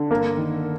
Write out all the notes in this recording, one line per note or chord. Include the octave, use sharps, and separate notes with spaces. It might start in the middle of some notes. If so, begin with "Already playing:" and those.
Already playing: D3
G1 A#3 A#4
D#3